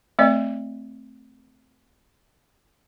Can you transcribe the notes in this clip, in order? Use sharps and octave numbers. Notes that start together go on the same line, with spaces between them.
A3 C4 D5 D#5